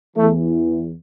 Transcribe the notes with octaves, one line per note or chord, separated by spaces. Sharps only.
E2 E3 A3 A4